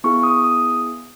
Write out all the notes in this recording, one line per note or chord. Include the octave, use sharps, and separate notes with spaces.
B3 E4 G#4 C#6
D#6
D#6